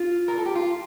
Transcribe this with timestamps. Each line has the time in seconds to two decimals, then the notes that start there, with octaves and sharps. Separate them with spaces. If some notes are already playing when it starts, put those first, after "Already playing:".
Already playing: F4
0.28 A#4
0.38 A4
0.46 G4
0.55 F4